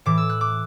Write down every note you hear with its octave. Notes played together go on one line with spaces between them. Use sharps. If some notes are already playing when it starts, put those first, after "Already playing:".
A2 E3 D6
E6
F#6
D6